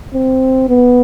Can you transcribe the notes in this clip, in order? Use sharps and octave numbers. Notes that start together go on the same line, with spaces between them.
C4
B3